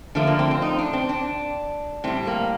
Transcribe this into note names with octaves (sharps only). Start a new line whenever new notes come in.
D3 F3 A3 A#3
A#3
C4
C4
D#4
D4
C4
D4
A2 G3 C4
A#3